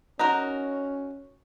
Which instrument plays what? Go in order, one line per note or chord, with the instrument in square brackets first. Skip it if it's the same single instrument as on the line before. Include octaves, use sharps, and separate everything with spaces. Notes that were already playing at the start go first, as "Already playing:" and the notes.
[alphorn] C#4 [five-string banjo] D#4 F#4 A#4